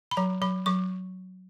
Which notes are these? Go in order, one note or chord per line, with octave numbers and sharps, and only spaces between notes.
B5
F#3 A#5
F#3 B5
F#3 C#6